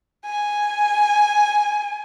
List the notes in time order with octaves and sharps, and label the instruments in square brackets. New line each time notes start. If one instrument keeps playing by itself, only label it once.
[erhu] G#5